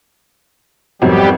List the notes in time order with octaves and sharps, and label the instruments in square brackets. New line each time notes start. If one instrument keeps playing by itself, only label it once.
[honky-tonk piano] G#1 F2 F#3 [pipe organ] G3 B3 G4